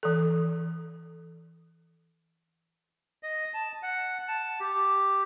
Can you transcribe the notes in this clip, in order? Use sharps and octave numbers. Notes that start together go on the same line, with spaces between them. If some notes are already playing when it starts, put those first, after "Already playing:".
E3 A4
D#5
A5
F#5
A5
G4